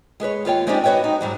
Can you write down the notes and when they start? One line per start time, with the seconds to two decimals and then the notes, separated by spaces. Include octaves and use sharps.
0.20 G#3 G#4 B4 C#5
0.45 D#2 F4 C#5 G5
0.67 G#3 C4 C#4 D#4 G4 D5
0.84 F#4 B4 C#5 D#5 G5
1.04 D#4
1.21 G#2 F#3 G3